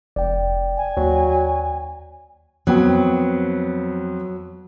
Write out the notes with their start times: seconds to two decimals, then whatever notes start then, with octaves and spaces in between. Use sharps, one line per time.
0.16 F1 D5 G5
0.76 G#5
0.97 D#2 F#3
2.67 F2 F#3 B3 G5